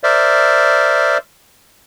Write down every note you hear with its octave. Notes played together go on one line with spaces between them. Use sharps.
A#4 C5 D5 E5